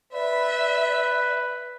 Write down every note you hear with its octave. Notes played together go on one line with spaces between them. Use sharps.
B4 D5 E5